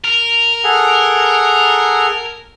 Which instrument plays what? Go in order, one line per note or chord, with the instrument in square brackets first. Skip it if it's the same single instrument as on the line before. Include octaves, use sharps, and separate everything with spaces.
[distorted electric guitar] A#4
[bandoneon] G#4 A4 F#5